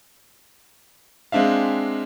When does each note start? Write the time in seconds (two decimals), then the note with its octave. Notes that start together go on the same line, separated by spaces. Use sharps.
1.32 G#3 C4 D4 E5 F5